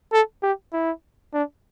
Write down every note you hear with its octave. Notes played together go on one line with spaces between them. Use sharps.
A4
G4
E4
D4